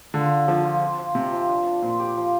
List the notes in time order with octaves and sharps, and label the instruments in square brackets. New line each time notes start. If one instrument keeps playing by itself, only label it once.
[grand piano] D3 [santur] F4
[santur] D4
[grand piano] F3 [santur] D4
[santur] F4
C4
F3
[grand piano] C3 [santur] C4
[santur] F3
D4
D4
[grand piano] A#2 [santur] C5
[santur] G4
F3